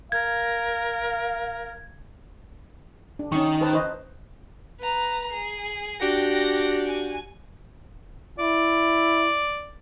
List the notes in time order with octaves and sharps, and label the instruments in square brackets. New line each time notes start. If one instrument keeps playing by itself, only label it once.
[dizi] A#4 [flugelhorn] F5 [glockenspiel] G#6
[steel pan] D4
[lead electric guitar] D#3 [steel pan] C#4 C#6
[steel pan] B4 C5 A5
B4 C5 D#5
[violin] B4 A#5
G#4
[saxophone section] D4 F#4 G4 [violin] G5 A#6
[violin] G#5
[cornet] E4 [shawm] D5